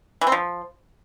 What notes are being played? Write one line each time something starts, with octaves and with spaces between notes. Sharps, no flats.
E3
C4
F3